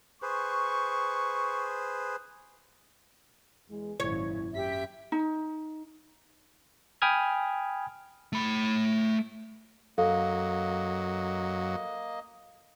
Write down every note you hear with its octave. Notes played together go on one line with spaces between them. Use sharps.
G#4 B4 C5 C#6
E2 G#3
G#1 F#2 A#2 E4 C#5
F#2 G4 E5 B6
D#4
G5 G#5 B5 D#6 F6 G#6
A3 B5
F#2 F#3 A#3 A4 D#5 F5